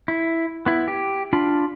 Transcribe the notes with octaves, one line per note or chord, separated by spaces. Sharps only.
E4
B3 E4
G4
D4 F4 B5